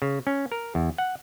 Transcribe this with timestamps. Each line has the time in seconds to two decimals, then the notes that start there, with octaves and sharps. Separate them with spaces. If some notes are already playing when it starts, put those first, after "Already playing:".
0.02 C#3
0.27 C#4
0.52 A#4
0.75 E2
0.98 F#5